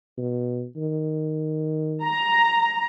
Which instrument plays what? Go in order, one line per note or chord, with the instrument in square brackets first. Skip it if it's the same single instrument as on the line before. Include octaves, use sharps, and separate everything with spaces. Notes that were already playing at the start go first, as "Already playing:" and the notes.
[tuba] B2
D#3
[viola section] A#5